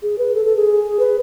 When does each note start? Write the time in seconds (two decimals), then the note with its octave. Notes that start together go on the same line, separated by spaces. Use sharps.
0.02 G#4
0.18 B4
0.34 A4
0.45 A4
0.56 G#4
0.99 B4